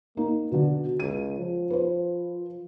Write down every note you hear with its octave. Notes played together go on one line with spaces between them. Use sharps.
A#3 D#4
B2 D3 F#4
C#2 D#7
F3
B4 C5